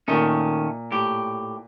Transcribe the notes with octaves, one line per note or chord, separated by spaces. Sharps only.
A#2 D#3 A3 C#4
A2 G4